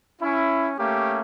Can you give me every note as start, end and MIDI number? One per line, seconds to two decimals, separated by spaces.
0.22 0.74 61
0.22 0.74 64
0.79 1.21 57
0.79 1.21 58
0.79 1.21 61
0.79 1.21 67